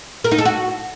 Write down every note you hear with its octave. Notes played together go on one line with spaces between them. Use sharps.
A#4
D#4
A4
F#4